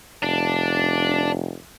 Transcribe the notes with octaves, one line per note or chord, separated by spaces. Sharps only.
F1 D4